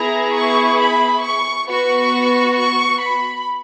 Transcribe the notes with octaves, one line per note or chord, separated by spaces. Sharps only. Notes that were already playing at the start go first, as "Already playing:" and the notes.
Already playing: B3 E4 G#4 A#5
C#6
B5
C#6
B3 F#4 C#6
C#6
B5